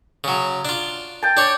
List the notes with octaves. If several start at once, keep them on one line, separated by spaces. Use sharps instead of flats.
C#3 F#3
D4 F4
G5 A5
D4 C#5 D5